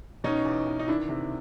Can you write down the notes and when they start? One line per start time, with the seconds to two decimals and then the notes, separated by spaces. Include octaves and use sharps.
0.24 B2 C#4 D#4
0.45 E2
0.66 E2
0.79 D#4
0.88 D#3 D4 E4
1.09 C3